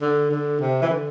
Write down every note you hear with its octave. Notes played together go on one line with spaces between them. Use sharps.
D3
D3
C3
E3
D3